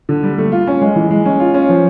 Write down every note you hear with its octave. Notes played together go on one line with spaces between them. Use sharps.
D3
G3
A3
F4
C#4
G#3
E3
G#3
C#4
F4
C#4
F3